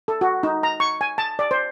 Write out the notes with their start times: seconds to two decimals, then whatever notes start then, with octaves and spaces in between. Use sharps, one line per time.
0.08 A4
0.21 F#4
0.43 D#4
0.63 A#5
0.80 C#6
1.01 G#5
1.18 A5
1.39 D5
1.51 C5